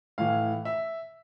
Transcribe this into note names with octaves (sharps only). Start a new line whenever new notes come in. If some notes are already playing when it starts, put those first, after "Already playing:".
A2 E3 F5
E5